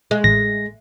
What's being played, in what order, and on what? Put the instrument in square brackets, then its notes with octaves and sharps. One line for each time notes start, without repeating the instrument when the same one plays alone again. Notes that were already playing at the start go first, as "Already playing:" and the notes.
[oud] G#3
[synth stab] A1 [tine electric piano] A#6